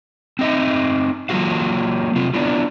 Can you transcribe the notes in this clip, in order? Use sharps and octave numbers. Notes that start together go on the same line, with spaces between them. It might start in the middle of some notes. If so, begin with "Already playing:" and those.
C4 D#4 D#5 E5
F#3 A#3 F4 F#4 F5
C3 C4 F4
B3 D4 E4 F4